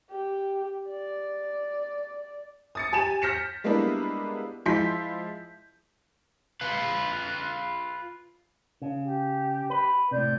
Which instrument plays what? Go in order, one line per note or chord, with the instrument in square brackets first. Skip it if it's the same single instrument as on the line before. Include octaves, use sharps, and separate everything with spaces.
[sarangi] G4
D5
[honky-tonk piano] D#6 A6 C#7
G4 G#5 A6 E7
F6 G6 A#6 B6 C#7 E7
G3 G#3 A#3 B3 D4 E4
F3 G#3 E4 C6 G6 B6
[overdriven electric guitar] F4 B4
[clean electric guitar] C#3
[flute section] G4
[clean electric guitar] B4
[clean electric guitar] A2 C3 [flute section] D5 G6